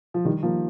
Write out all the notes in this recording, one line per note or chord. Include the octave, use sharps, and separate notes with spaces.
F3
D#3 G3
F3 A#3